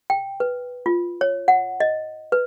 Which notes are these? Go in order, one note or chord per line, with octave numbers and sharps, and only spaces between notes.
G5
B4
F4
C#5
F#5
D#5
B4